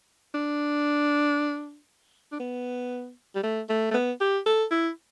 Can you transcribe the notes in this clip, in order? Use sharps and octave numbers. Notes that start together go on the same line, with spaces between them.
D4
D4
B3
G3
A3
A3
A3
B3
G4
A4
E4